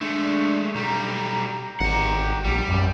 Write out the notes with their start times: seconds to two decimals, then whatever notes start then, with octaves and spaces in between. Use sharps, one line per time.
0.01 G#3 A3 D4
0.75 B1 G3 A#5
1.80 G#1 G4 F#5
2.44 A#1 G3
2.69 F#2